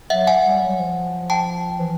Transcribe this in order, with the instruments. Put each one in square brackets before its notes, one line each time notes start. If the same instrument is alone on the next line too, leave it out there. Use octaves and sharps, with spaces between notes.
[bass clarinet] F#3 [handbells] E5 F#5
[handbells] F#5 G#5
[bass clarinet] G3
F#3
F3
[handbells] G5 A5
[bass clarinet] E3